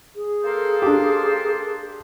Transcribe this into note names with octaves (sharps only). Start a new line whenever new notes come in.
G#4
A#3 A4 C5
D4 G4